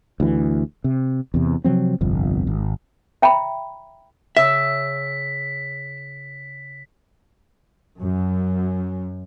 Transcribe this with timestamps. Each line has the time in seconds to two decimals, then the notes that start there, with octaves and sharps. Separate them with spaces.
0.20 D2 E3
0.84 C3
1.34 E2 C3
1.64 C3 F3 F#3 C4
2.01 G1 C2 F2
2.47 G#1
3.22 E5 G5 A#5 B5
4.37 C#3 E5 E6 B6
8.00 F#2